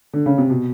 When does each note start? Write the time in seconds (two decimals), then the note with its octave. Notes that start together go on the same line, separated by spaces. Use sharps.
0.13 D3
0.26 C#3
0.38 C3
0.50 B2